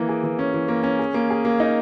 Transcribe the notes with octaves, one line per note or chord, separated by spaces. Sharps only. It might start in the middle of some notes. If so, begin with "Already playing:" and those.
Already playing: E3 A#3
G#4
E3
C#4
E3
A#3
C#4
G#4
A#3
G#4
A#3
D#4